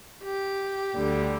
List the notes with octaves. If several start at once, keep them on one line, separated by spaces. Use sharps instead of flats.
G4
D2 D3 G3